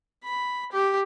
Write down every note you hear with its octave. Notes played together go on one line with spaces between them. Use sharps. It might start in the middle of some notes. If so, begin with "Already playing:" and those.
B5
G4